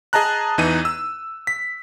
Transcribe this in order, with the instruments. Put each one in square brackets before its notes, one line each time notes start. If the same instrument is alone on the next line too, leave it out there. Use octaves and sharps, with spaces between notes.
[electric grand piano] G#4 D#5 A5 A#5 F#6
E2 E3 D#4 D#7
E6
B6